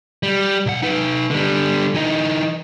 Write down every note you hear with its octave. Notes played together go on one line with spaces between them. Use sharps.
G3
B1 F#5
D#4 B4
D3 G3
E3 D#4